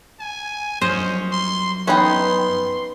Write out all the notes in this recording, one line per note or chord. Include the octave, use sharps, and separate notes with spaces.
G#5
G2 F3 F#3 C#4 C5 D#5
C6
B3 C#4 D#4 G5 B5 C6